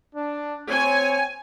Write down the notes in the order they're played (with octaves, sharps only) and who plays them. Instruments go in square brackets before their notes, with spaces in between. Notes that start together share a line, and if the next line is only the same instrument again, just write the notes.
[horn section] D4
[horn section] C4 C#5 [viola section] G#5